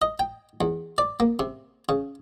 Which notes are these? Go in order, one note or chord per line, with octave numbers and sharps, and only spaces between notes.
D#5
G5
E2
D5
A#3
C3
C#3